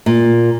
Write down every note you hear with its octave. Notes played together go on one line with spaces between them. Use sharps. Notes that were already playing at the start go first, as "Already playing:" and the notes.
A#2